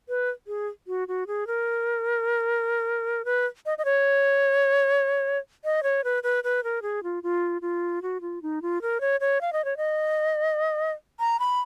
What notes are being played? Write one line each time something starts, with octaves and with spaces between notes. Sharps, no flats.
B4
G#4
F#4
F#4
G#4
A#4
B4
D#5
D#5
C#5
D#5
C#5
B4
B4
B4
A#4
G#4
F4
F4
F4
F#4
F4
D#4
F4
A#4
C#5
C#5
F5
D#5
C#5
D#5
A#5
B5